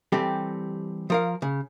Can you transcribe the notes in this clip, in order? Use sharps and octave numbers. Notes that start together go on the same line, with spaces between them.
E3 G3 C4 G4 A4
F3 A#4 F5
C#3